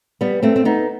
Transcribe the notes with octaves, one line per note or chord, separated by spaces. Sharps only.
G3 B3
A3 C4
C4
B3 D#4